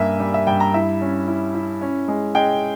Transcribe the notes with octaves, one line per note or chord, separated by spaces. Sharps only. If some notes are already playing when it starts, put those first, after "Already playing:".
Already playing: G2 A#3 E5 G#5
G3
E5
G2 G5
A#5
E4 E5
C#4
E4
E4
C#4
G#3
G#3 G5